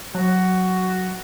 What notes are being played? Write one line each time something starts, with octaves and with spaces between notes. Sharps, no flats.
F#3 F#4